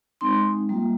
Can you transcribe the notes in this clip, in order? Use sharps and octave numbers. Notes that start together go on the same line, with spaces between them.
G#3 C4 D#4 C6
G3 A#3 F4